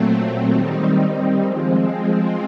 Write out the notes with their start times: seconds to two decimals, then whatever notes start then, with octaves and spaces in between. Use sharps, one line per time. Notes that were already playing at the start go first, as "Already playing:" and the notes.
Already playing: A#2 F#3 A3 C4
0.51 D#3 G3 C4 D#4
1.44 F3 G#3 C4